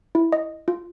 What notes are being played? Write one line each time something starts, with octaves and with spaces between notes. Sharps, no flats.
E4
D#5
F4